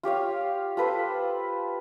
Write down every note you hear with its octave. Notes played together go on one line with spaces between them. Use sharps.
F4 G4 C#5 F5
F4 A4 B4 C5